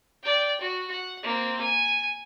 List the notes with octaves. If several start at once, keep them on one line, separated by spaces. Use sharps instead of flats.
D5 G5
F#4
F#5
A#3 C4
G#5